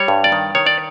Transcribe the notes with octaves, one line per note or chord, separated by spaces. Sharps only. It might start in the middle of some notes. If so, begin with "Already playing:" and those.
Already playing: G3 C#5
G2
D5
D#3
D#3 C#5
D5